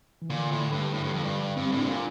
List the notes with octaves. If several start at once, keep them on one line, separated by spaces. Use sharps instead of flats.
E3
A#2 D3
A2
G2
A2
G2
F2
G2
G2 C4
A2
C3 D4
A#2